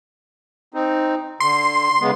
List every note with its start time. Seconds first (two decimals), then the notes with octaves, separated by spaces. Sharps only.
0.74 C4 D#4
1.40 D3 C6
2.01 C#3 G#3 B3